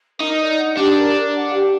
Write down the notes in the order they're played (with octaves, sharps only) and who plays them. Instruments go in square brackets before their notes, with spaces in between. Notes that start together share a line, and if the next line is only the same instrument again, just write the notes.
[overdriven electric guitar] D#4 [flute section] A#4
[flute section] D5
F#5
[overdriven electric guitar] D4 [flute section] G4
[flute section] A#4
D5
F#5
G4